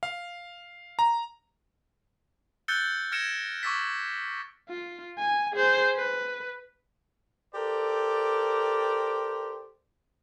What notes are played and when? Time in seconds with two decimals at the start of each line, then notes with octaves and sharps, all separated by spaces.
0.03 F5
0.99 A#5
2.68 E6 F#6 G6 A6 C#7 G7
3.12 F6 G#6 A#6 C#7 D7 E7
3.63 C#6 D6 E6 A6 B6
4.69 F4
5.19 G#5
5.53 G#4 C5
5.96 B4
7.55 G4 A4 A#4 C5 D5